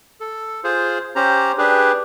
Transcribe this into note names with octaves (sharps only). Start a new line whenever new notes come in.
A4
F4 G#4 C5
C#4 G4 C5 A#5
D4 G4 G#4 B4